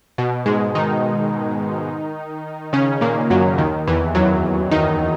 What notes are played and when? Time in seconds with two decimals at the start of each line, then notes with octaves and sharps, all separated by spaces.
0.18 B2
0.46 G#2 G#3
0.75 D#3 D#4
2.73 C#3 C#4
3.01 A#2 A#3
3.30 F#2 F#3
3.58 D#2 D#3
3.88 E2 E3
4.15 F#2 F#3
4.71 D#3 D#4